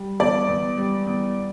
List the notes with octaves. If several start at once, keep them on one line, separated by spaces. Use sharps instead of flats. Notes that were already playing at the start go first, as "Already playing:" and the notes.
Already playing: G3
E2 D5
E2
G3
E2